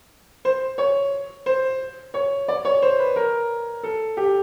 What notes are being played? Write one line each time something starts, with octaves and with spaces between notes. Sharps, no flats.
C5
C#5
C5
C#5
D5
C#5
C5
B4
A#4
A4
G4